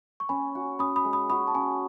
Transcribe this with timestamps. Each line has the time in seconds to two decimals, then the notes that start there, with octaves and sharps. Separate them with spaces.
0.20 C#6
0.29 C#4 G#5 B5
0.55 F#4
0.79 C#4 B5 D#6
0.96 B5 D#6
1.05 G#3
1.13 B5 D#6
1.30 F#4 B5 D#6
1.48 A5
1.55 C#4 G#5 B5